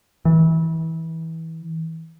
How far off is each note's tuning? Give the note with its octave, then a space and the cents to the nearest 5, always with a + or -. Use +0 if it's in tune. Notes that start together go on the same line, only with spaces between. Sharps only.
E3 -25